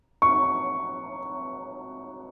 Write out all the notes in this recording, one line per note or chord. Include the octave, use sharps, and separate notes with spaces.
C#6